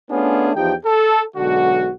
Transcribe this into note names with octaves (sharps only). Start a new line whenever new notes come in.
A3 B3 C#4 D4 F4 G#4
E2 F3 D#4 G4 G5
A4
B1 D3 G#3 F#4